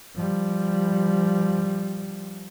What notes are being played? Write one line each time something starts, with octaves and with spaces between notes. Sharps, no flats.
F3 G3